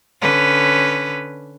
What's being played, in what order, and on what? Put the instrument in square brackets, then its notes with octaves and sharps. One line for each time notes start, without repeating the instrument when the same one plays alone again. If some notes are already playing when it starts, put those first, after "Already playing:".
[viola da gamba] D3 C#4 B4